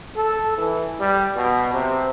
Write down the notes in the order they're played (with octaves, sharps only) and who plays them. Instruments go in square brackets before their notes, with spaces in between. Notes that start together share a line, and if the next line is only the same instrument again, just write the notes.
[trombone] A4
E3
G3
B2
C3